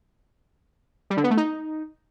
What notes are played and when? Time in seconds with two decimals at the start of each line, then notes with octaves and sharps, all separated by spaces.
1.10 G3
1.17 D3
1.24 B3
1.31 A3
1.37 D#4